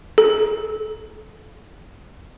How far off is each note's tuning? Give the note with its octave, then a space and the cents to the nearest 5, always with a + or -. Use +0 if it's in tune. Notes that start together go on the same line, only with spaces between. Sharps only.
A4 -35